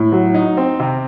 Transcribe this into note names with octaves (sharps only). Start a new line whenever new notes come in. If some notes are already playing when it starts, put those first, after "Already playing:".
Already playing: A2
F#3
D#4
C4
C3